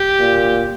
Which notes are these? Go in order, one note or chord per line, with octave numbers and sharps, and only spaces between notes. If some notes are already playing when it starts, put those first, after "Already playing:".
Already playing: G4
A#2